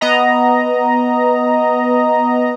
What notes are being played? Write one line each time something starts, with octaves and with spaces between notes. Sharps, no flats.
B3 D#5 A#5